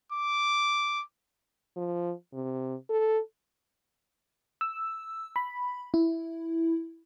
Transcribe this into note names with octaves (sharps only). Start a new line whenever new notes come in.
D6
F3
C3
A4
E6
B5
E4